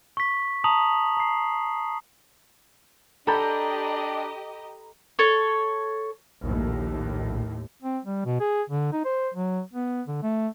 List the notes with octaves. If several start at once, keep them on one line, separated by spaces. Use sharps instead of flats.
C#6 B6
A5 A#5 D#6 F7 F#7
A#5 C7
D4 G4 A4 D#5 A#5 B5 G6
A4 C#5
A#1 D#2 A2
C4
G3
B2
G#4
D3
D#4
C5
F#3
B3
D3
A3